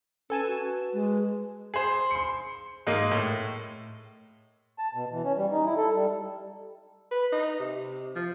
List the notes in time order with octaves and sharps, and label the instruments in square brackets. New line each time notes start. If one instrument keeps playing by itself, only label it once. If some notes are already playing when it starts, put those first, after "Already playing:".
[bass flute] C#4 [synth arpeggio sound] A4 G#5 A5 [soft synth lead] B4
[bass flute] F#4 [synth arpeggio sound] E7
[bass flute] G#3
[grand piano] G#4 C5
C6 C#7
G#2 G#3 A#3
A2
[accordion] A5
B2
E3
C#4
G3
D#4
E4
A4
G3
[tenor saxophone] B4
D#4
C3
F3